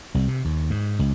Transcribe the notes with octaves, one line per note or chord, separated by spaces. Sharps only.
C2
C3
D#2
G#2
C#2